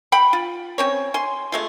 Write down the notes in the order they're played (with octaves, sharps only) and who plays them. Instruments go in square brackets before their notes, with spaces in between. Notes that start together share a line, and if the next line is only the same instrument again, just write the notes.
[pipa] F#5 G5 B5
F4
C4 C#4 C#5
G#5 C6
G#3 A3 F4